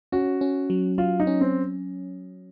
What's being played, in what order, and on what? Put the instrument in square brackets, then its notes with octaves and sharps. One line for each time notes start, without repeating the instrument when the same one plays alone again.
[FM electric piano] C#4 [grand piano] F#4
[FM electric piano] C#4
F#3
[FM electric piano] F#3 [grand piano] F4
[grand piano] D#4
[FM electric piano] C#4
[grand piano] C4